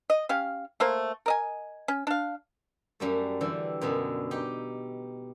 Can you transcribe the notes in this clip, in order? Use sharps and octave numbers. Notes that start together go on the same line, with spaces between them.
D#5
C#4 G4 F5
A3 A#3 C5
A#4 D#5 G#5
C#4
D4 F5
F#2 G3 A3
D3 E3 G3
F#2 B2 D3
D#4 G4